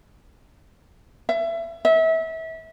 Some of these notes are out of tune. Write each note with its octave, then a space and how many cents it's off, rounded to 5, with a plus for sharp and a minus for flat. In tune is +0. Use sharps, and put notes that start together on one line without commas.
E5 +25
E5 -30